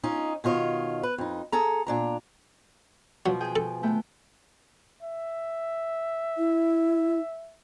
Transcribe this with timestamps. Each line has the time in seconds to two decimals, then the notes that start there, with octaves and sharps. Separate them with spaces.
0.03 C#4 D#4 F4
0.44 B2 D#3 F4 C#5
1.03 B4
1.18 F2 D#4
1.52 G#4 A4 A#5
1.87 A#2 D4 A#5
3.26 B2 F3 F#3 B3
3.40 G#4 G5
3.56 A4
3.83 A3 B3 G5
5.03 E5
6.38 E4